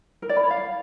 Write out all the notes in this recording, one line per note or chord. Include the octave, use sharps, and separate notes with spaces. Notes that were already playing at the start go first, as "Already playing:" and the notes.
A#4
D5
B5
C#5
F5